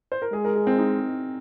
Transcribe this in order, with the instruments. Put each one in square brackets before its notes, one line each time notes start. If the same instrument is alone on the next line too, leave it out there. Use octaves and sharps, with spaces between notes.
[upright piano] C5
A#4
[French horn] G#3 [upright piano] G#4
[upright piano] A#4
G#4
C4
D#4